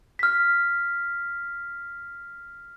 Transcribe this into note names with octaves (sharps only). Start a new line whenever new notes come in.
F6 B6